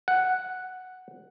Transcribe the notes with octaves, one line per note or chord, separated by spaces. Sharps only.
F#5